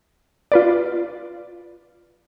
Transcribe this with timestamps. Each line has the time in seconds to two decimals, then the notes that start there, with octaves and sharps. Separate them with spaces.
0.52 F4 B4 D5